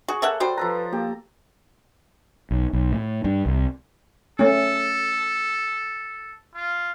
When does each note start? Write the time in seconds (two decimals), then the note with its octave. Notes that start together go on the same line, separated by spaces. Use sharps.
0.08 F#4 G#4
0.22 A#3 A4 C#5 E5 F#5
0.40 G3 F#4 C5
0.57 F3 A4 B4 A#5
0.93 A#3 G4
2.51 B1
2.73 B1
2.92 A2
3.24 G2
3.46 C2
4.39 A3 C#4 A4
6.54 F4